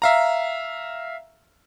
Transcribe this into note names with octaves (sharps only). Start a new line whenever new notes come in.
E5 F5 A#5